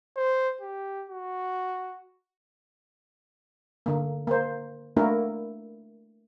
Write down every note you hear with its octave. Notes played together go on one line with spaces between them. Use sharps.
C5
G4
F#4
D3 A#3
A#3 C5
A3 A#3 D4 E4 F#4 A#4